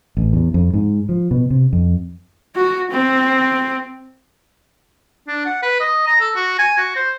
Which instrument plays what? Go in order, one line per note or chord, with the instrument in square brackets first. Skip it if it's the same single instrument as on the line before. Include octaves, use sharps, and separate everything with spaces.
[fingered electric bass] A1
E2
F2
G#2
F3
B2
C3
F2
[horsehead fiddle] F#4
C4
[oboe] D4
F#5
B4
D#5
A#5
A4
F#4
G#5
F#4
C5